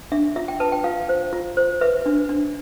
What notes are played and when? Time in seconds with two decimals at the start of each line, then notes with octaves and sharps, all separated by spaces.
0.12 D4 E5
0.36 F4 E5
0.48 G5
0.60 B4 A5
0.72 G5
0.84 F4 F5
1.09 C5
1.33 F4
1.57 C5
1.81 B4 E5
2.06 D4
2.29 D4